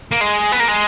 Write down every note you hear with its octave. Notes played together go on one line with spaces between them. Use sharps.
A#3
G#3
B3
A#3
G#3